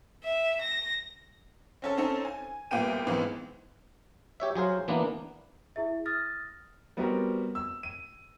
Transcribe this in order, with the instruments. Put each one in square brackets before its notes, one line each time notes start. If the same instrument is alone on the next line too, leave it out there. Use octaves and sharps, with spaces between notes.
[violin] E5
A#6
[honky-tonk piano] C4 C#4 A4
C4 C#4 D#4 A4
G#5
C2 A#2 B3 G5 D#7
C#2 G#2 E3 B3 C4
[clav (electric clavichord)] G4 C#5 E5
F#3 G#4 C5 F5
E3 A#3 B3 D4
[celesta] E4 G#4 E5
D#6 F6 A6 A#6
[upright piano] G3 B3 C4 F#4 G4 A#4
E6
D#7